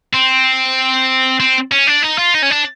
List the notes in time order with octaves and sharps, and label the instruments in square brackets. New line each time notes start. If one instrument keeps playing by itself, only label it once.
[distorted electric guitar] C4
C4
C#4
D4
D#4
F4
D#4
C#4
D4